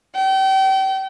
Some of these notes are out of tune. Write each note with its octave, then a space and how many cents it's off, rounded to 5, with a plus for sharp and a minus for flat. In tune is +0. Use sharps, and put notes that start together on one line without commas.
G5 -35